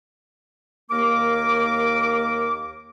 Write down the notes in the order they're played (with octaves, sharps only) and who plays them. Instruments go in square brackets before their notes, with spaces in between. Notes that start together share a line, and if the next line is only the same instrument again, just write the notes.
[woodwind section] D#2 A#3 A#4 D6